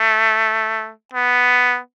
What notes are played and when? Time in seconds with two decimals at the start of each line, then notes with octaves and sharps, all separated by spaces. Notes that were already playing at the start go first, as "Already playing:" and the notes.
Already playing: A3
1.14 B3